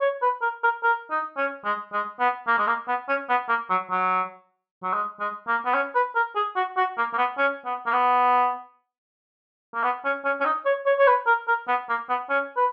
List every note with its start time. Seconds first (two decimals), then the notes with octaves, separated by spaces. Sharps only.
0.01 C#5
0.22 B4
0.42 A#4
0.63 A#4
0.84 A#4
1.11 D#4
1.37 C#4
1.65 G#3
1.93 G#3
2.20 B3
2.48 A#3
2.59 G#3
2.67 A#3
2.88 B3
3.09 C#4
3.29 B3
3.49 A#3
3.70 F#3
3.91 F#3
4.84 F#3
4.93 G#3
5.20 G#3
5.48 A#3
5.66 B3
5.75 C#4
5.95 B4
6.16 A#4
6.36 G#4
6.56 F#4
6.77 F#4
6.98 A#3
7.13 A#3
7.18 B3
7.38 C#4
7.65 B3
7.87 A#3
7.93 B3
9.75 A#3
9.83 B3
10.05 C#4
10.25 C#4
10.41 C#4
10.45 D#4
10.66 C#5
10.86 C#5
10.99 C#5
11.07 B4
11.27 A#4
11.48 A#4
11.68 B3
11.89 A#3
12.09 B3
12.30 C#4
12.57 B4